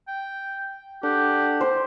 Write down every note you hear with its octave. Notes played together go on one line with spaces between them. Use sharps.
G5
D4 G4 A4 F#5
C5